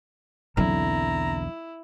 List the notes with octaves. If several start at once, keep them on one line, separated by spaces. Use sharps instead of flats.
B1 E2 D3 F#3 C4 E4 A#5